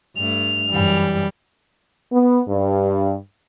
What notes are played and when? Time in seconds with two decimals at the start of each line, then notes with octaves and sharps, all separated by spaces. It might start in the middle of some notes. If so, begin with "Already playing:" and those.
0.16 G2 A3 F7
0.69 F#2 E3 G3
2.12 B3
2.48 G2